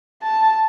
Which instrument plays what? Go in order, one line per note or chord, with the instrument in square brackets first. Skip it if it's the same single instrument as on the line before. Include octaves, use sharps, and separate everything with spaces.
[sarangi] A5